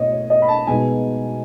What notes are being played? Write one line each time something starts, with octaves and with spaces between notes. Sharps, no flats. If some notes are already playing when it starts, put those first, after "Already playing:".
Already playing: B2 A3 E4 C#5 D#5
C#5
D#5
B5
A5
B2 G#3 B3 D#4 G#5